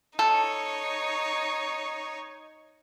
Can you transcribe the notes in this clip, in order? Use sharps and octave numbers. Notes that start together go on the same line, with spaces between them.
D#4 A4 C#5